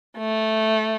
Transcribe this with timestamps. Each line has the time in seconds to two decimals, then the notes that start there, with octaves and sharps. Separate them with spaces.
0.18 A3